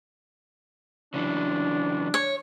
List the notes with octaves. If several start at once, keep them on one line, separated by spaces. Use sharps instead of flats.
C#3 E3 F#3 D4
C#5